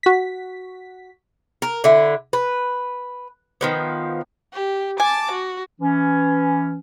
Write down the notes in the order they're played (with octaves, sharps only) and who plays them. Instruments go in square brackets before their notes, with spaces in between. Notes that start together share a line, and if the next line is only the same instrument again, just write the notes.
[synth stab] F#4 B6
[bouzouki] A#4
D3 E4
B4
D#3 F3 B3
[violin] G4
[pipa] G#5 [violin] A5 D6
[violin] F#4
[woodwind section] E3 C#4